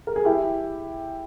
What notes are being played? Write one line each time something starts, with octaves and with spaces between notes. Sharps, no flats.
A#4
G#4
E4 G4